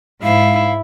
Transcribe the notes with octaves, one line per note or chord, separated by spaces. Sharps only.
G#2 E4 F5